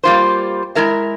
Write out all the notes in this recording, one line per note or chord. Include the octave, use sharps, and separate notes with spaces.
G3 A#3 F4 C5
G#3 E4 A#4 E5